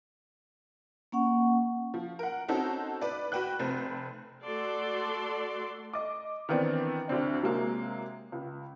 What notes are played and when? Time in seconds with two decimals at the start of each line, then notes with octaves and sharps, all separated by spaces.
1.12 A#3 C#4 F#5 C#6
1.94 F3
2.19 A#4 F#5
2.48 C4 C#4 D#4 F#4 A4
3.01 B4 D5
3.32 F#4 B4 G5 F#6
3.59 F1 A3 C4
4.43 A3 F#4 A4 D5 C6
5.93 D#5 D6
6.49 D#3 E3 B3 C4 D4
7.08 D2 D3 C4 D4
7.42 C3 F#3 G#3 A#3
8.32 C#2